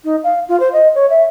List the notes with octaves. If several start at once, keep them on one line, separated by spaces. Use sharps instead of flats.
D#4
F5
F4
C5
D#5
C#5
E5